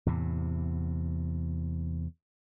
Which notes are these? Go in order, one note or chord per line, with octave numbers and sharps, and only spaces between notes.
E2 A2 C3